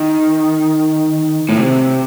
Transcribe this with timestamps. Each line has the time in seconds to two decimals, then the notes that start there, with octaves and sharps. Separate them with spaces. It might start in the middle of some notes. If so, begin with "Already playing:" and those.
Already playing: D#3
1.49 A2
1.57 C3